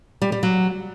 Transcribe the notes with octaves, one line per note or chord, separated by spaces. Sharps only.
G3
G3
F#3